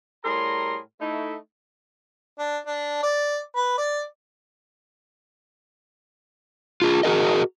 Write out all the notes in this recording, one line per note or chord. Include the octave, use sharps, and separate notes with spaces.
A2 G3 G#4 A#4 A#5 C6
A3 D#4 E4
D4
D4
D5
B4
D5
F4 G#4
F#4 G#4 A#4 D#5